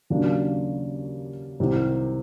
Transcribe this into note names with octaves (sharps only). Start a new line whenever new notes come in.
D#2 C#3 F#3 A#3 D4
C2 C3 D#3